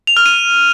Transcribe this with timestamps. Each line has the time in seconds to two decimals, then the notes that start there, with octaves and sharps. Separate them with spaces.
0.07 F7
0.17 F6
0.26 D#7